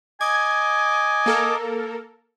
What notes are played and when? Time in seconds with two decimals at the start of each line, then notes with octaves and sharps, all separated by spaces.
0.21 D#5 G#5 D6 G#6
1.26 A#3 A4 A#4